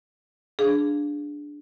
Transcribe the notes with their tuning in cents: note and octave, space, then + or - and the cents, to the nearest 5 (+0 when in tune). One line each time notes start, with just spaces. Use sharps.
D4 +0 G#4 +0 F5 +0